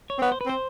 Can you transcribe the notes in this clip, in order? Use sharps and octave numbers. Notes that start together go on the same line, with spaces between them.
C#5
C4
B3 C#5
C5
B4
C4 C5